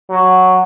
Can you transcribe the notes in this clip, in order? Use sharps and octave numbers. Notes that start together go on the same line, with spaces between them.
F#3